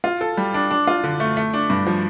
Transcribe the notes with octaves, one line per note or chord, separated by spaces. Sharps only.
F4
A4
G3
D4
D4
F4
D3
A3
A3
D4
G2
F3